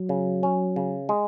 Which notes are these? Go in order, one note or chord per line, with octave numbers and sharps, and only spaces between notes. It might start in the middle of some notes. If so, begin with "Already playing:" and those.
Already playing: F#3
C#3
C#4
C#3
G#3